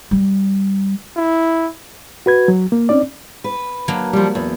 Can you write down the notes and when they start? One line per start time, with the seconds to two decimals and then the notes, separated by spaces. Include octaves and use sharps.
0.11 G3
1.17 E4
2.26 F#4 B4 G#6
2.48 F#3
2.72 A#3
2.89 C4 C#4 D#4 D5
3.44 B4
3.88 F#3 A#3 D4
4.13 F3 G3
4.35 E2